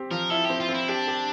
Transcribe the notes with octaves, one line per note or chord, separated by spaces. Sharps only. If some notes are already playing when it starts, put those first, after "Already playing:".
Already playing: C4 G4
F3 A#4
E4 A4
C4 G4
F4
C4
E4
D4 G4
G4